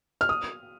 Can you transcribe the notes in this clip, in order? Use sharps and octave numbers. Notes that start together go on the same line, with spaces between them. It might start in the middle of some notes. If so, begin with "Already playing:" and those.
F6
D#6